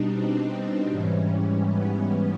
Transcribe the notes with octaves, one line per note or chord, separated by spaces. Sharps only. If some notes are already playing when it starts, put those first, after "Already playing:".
Already playing: B2 G3 D4 D#4
C4
G#2 E3 G3 C#4
B3